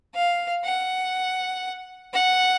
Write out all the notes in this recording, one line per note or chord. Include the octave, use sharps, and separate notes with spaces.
F5
F#5
F#5